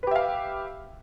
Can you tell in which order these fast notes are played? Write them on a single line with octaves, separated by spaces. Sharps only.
B4 G4 E5 F5